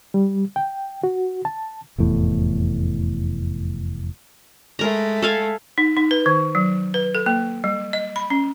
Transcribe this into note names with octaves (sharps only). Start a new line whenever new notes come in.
G3
G5
F#4
A5
F1 E2 A2
G#3 A3 A#4 A#5
A4 F5 G#5
D#4
D#4
B4
D#3
F#3
B4
A4
A#3
G3
D#5
B5
C#4